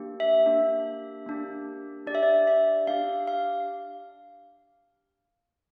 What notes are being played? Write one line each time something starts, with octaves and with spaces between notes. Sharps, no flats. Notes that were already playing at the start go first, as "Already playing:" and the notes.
Already playing: A#3 D4 G4
E5
A#3 D4 G4
A#3 D4 G4
D4 G4 D5 E5
D5
E5
D4 G4 F5
F5